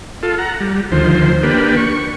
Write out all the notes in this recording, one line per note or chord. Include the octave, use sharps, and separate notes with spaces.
F4 A4
F#5 A#5
G3
D2 D#3 F3 C5
A#3 D4 G4 B4
C#6